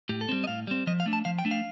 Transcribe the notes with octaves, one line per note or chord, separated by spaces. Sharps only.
A2 G4
A4
G3 C4 G4
D#5
A2 F5
G3 C4
F3 D#5
F5
A3 D4
A5
F3 F5
G5
A3 D4
F5